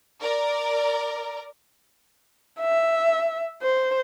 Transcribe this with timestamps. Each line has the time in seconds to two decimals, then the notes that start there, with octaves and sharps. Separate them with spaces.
0.20 A#4 D5
2.60 E5
3.62 C5